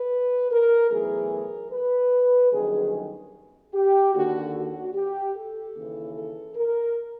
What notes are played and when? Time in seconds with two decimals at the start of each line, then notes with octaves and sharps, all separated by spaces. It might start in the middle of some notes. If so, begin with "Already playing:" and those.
Already playing: B4
0.51 A#4
0.90 B1 A2 E3 G#4
1.31 A#4
1.72 B4
2.52 G1 F#2 D#3 G#4
3.74 G4
4.14 D#2 D3 F#4
4.54 F#4
4.94 G4
5.35 A4
5.75 D#2 C#3 E3
6.15 A4
6.56 A#4